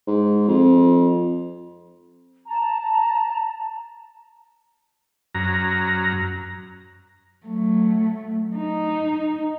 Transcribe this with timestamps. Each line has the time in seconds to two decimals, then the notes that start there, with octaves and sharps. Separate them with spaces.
0.07 G#2
0.48 F2
2.46 A5 A#5
5.35 F#2 A#5
7.46 F#3 A3
8.56 D#4